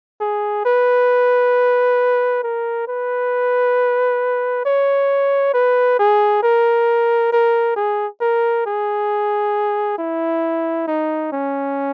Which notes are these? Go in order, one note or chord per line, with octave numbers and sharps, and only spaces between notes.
G#4
B4
A#4
B4
C#5
B4
G#4
A#4
A#4
G#4
A#4
G#4
E4
D#4
C#4